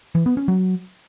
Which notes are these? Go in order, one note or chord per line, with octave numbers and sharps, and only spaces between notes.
E3
B3
C#4
F#3